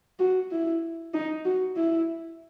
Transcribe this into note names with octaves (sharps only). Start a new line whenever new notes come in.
F#4
E4
D#4
F#4
E4